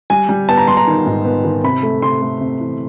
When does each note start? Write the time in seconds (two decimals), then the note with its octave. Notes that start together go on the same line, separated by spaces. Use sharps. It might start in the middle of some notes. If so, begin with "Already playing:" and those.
0.10 G3 G#5
0.29 G3
0.49 B3 A5
0.58 A#5
0.67 G3 C6
0.77 A#5
0.87 D#3
1.06 G#2
1.25 B3
1.45 D#3
1.64 C3 B5
1.83 A3
2.02 C3 C6
2.22 A3
2.41 C3
2.61 E3